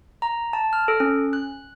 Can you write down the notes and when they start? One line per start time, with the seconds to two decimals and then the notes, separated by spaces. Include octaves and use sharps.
0.22 A#5
0.53 A5
0.73 F6
0.88 A4
1.00 C#4
1.33 F#6